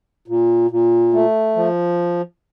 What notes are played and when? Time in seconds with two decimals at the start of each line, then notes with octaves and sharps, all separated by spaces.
0.28 A#2
0.71 A#2
1.13 A3
1.56 F3